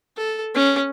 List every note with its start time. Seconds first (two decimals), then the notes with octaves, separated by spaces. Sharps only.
0.17 A4
0.54 C#4